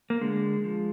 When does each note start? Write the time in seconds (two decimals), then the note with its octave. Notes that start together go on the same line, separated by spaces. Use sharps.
0.10 A#3
0.21 D3 G#3
0.64 F3